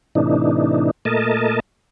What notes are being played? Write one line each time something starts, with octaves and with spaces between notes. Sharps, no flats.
A2 C3 E3 D4 D#4
A#2 A3 A#4 D#5 A5